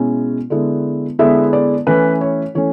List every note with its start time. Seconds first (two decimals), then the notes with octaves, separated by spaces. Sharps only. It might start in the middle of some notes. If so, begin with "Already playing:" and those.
Already playing: B2 G#3 C#4 E4
0.50 D3 G#3 B3 E4
1.19 D3 G#3 B3 E4 E5
1.53 D5
1.87 E3 A3 C#4 E4 B4
2.21 C#5
2.55 E3 A3 C#4 C#5